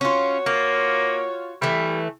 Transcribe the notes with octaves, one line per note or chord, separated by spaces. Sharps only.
C#4 F4 F#4 C#5
A#3 F4
E3 G3 A3